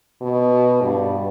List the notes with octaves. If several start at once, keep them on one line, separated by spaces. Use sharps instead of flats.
B2
G2